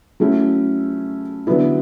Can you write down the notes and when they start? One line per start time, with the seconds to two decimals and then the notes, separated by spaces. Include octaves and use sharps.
0.20 F#3 A3 C#4 E4
1.47 D3 F#3 B3 E4